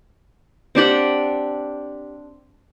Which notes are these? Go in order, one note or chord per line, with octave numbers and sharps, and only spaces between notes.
C4 D4 G4 F#5